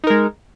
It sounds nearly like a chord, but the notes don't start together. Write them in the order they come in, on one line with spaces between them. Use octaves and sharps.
D#4 A#4 G#3